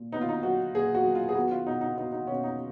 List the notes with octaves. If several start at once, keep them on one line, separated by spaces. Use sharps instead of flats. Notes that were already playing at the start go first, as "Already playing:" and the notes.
Already playing: A#2
B3 D#4
F4
D#4
F#3 F#4
A#2 G#4
F#4
F#3
F4
G#4
B3 F#4
F4
B2 D#4
D#4
B3 D#4
D#4
B2 C#4
D#4